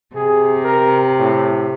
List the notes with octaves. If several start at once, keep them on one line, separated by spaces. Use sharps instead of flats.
C3 G#4
A#4
A2